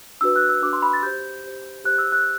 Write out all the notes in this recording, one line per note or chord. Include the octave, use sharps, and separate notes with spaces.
D4 F#4 B4 E6
F#6
E6
D4 F#4 B4 D6
C6
B5
A6
G4 C5 G6
G4 C5
G4 C5 F#6
E6
F#6